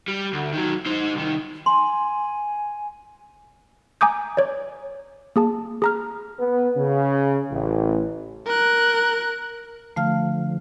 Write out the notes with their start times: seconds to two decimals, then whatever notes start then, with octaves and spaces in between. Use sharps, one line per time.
0.08 G3
0.33 D2
0.53 D#3 F#3
0.86 D#4 C5
1.14 C2 D#3
1.66 G#5 C6
4.01 G#5 A#5 D6 D#6 G6
4.37 C#5 D5
5.36 A#3 G#4 A5
5.82 G#4 A#5 F6
6.39 B3
6.76 C#3
7.51 A1
8.46 A#4 F#6
9.96 D3 F3 A3 F5 F6